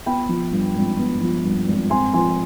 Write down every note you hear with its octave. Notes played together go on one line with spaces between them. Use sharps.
B3 G5 B5
F3
G2
G#1
B3
F3
G2
G#1
C4 G#5 C6
F3 G#5 C6